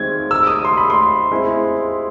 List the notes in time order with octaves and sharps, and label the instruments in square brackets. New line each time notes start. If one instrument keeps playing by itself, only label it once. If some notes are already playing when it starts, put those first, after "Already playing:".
Already playing: [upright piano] D#3 G#3 C4 [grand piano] G#6
[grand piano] E6
D#6
C6
B5
C6
[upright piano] G#3 C4 E4